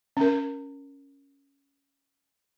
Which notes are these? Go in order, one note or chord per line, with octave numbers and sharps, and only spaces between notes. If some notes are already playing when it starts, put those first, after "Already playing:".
C#4 A#4